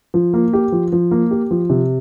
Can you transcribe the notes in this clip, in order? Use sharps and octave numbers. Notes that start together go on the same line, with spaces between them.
F3
A#3
G4
F3
F3
A#3
G4
F3
C3